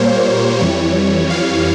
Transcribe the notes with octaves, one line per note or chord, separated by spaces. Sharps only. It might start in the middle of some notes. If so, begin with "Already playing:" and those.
Already playing: A#2 G3 A#3 C5 C#5
F2 E3 G3 C#5
F5